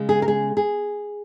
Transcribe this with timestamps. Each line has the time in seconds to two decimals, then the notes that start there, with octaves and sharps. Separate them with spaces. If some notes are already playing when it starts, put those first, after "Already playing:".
Already playing: C#3 G#3
0.09 G#4
0.22 A#4
0.28 G#4
0.57 G#4